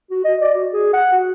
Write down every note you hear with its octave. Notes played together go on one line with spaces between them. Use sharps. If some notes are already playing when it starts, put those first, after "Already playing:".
F#4
D#5
D5
F#4
G#4
F#5
F#4